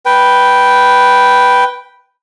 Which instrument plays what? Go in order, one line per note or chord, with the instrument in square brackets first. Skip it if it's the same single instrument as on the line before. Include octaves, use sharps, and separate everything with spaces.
[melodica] B4 G5